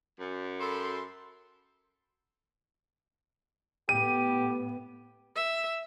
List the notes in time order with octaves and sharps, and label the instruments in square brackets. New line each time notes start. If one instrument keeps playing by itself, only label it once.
[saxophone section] F#2
[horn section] A4 B5 C6
[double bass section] A2 B3 [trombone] G4 [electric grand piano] D#7
[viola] E5